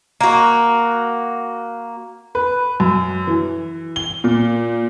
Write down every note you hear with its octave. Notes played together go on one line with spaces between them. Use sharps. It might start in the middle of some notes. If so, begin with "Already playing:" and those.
A#3 F#4
B4
F#2
E3
G7
A#2